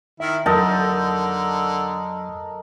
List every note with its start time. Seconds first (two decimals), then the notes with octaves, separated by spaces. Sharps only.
0.20 D#3 E4 E5
0.46 F2 D3 F#3 D#4 A4 A#4